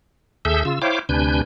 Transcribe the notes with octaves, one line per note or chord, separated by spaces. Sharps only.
D#2 G#4 A4 E5 E6 G6
C#3 F4 E6
E4 C5 C#5 F5 G5 D6
D2 C3 D4 B4 G#5 G6